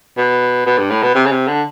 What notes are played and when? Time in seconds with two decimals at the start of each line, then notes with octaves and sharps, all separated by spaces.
0.17 B2
0.66 B2
0.78 G2
0.90 A2
1.03 B2
1.15 C3
1.26 C#3
1.31 C3
1.48 D3